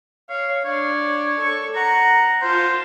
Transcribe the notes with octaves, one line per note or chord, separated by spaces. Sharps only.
C#5 F5
D4 C#5 D5
A4 C#6
F#5 A#5
F4 C5 A5